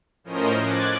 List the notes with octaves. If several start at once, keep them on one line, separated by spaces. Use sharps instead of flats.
A2 F3 C#4 A#4 C5 D#5
D6 F#6 G#6 A6